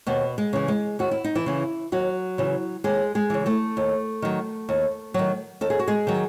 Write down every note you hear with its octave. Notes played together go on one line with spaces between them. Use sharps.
D#2 B2 B3
G#3
C#3 E3
G#3
D#2 F#4
E4
D#4
E3 E4
C#3 E3
D#2 F#3 F#4
C#3 E3
D#2 G#3 G#4
G#3 G#4
C#3 E3
A3 A4
D#2
D#3 F#3
D#2
D#3 F#3
D#2 A4
G#4
F#4
G#3 G#4
D#3 F#3